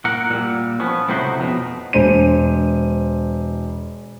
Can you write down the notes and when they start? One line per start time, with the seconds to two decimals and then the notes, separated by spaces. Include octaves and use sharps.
0.05 A#2 A#4 F#5
0.30 A#2 G3
0.80 F3 B3 C#4
1.08 C#2 A2 C3 D#4 F#4 C5
1.39 F2 B2
1.93 E1 C5 D#7